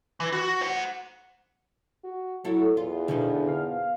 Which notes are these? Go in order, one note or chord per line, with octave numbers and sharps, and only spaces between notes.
E3
F#4
C5 F#5
F#4
F#3 E4 A4
E2 F4
B2 D3 F3 D#4
F5